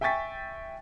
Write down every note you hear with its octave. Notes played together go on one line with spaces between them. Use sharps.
E5 G5 G#5 C#6 A6 B6